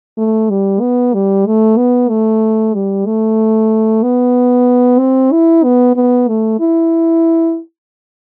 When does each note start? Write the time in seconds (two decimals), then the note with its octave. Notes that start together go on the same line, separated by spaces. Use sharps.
0.18 A3
0.50 G3
0.81 B3
1.14 G3
1.46 A3
1.77 B3
2.09 A3
2.75 G3
3.06 A3
4.03 B3
4.99 C4
5.32 E4
5.64 B3
5.96 B3
6.28 A3
6.60 E4